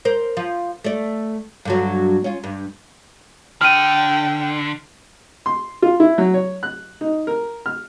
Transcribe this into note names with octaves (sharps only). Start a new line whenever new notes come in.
A#4 C5
F3
A3 D5
G2 D3 F#3
C#4 F4
G2
D3 G5 F6 D#7
C6
F4
E4
F#3
C#5
F#6
D#4
A#4
F6